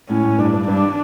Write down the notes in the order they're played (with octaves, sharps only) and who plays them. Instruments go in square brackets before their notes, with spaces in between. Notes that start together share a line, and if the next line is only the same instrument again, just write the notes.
[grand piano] A2 [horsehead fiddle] C#4
[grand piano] A2
[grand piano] G2 [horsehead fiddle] D4
[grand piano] G2
[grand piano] G2 [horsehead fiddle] D4